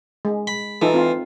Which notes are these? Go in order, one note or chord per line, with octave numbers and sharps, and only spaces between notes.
G#3
B5
E3 D#4 F4 A4
C4 F4